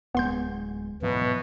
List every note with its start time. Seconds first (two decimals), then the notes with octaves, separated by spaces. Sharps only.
0.15 D1 G#3 B3 C6 G6
1.02 G#2 B2 E3 F#3 B4